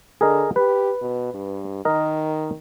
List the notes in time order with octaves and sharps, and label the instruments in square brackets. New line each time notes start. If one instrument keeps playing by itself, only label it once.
[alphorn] D3 [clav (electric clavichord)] G#4 A#4 D#5
[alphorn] G4 [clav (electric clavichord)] B4
[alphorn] B2
G2
[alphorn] D#3 [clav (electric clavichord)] A#4 D#5